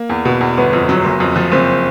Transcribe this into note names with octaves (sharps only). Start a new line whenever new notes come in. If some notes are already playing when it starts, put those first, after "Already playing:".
Already playing: A#3
E2
B2
E2
G1 B3
F2
F#3
F#1
F2
F3
F#1 C4